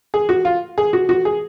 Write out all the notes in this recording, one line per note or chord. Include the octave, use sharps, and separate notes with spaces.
G#4
F#4
F4
G#4
F#4
F#4
G#4